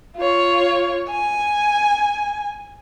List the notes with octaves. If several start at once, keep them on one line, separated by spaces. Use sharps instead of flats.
F4 C#5
G#5